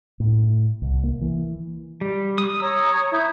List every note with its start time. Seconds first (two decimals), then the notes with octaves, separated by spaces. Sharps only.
0.20 A2
0.82 C2
1.04 A#3
1.21 E3
2.01 G3
2.38 D#6
2.60 C#5 A#5 D#6 E6
3.12 E4 D#6 G6